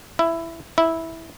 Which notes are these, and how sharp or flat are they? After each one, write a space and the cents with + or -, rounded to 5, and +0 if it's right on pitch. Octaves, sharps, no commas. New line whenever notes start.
E4 +10
E4 -10